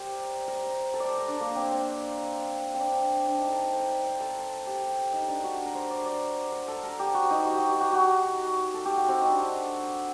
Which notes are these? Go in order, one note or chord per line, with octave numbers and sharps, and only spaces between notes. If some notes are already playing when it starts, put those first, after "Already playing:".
Already playing: G4 A#4 C5 D5
A#4
A4
C5 D5
A#4
D4
A#3
C4
C4
C4
D4
D4
D#4
A4
A#4
C5
D5
C5
A4
G4
D#4
D4
F#4
A#4
C5
D5
D5
A#4
A4
A#4
G4
F#4
D#4
F#4
G4
G4
F#4
F#4
A4
G4
F#4
C4
D#4
D4